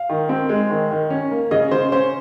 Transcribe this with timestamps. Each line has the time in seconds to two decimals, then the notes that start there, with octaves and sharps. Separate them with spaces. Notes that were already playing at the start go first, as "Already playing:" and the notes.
Already playing: F5
0.09 D#3
0.29 C4
0.49 G#3
0.70 D#3
0.91 D#3
1.10 C#4
1.31 A#3
1.51 C#3 D#5
1.71 C#3 C5
1.92 C#4 C5